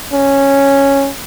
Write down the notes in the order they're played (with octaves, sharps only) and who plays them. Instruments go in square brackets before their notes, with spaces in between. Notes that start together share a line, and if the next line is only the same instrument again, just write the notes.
[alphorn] C#4